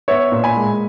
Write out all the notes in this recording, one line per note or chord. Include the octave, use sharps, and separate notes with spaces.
B3 C#5 E5
A#2
G#5 B5
G#3